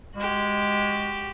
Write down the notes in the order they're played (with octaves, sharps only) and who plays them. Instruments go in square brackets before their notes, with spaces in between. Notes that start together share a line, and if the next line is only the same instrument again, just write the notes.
[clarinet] G#3 [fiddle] F#4 G4